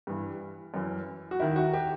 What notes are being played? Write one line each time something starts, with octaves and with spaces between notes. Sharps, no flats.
G2 E3
F#2 E3
F#4
D#2 D#3 E4
F#4
G4